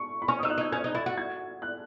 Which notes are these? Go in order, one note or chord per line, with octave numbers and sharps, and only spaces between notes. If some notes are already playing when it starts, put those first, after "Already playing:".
Already playing: C#6
B5
C#4 C#6
D#6
D#4 E6
F#6
D#4 G#6
C#4 G#6
D#4
E4 A6
F#4
G#6
F#6